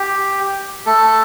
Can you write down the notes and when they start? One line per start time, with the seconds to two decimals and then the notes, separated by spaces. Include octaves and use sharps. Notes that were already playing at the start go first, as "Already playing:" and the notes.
Already playing: G4
0.86 A3 A4